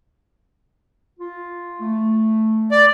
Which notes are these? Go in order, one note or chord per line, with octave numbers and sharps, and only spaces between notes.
F4
A3
D5